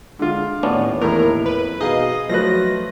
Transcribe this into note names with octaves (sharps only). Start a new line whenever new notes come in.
D3 G#3 F4
D#2 A2 B3 C#4 D4
E2 A2 A#4
F2 B4
B2 D#4 G#4 D#5 F5
F3 F#3 A3 B4 A#6